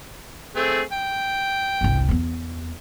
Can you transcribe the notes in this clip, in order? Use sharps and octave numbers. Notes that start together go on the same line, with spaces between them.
A3 C4 G#4
G5
G1 C2
E2 B3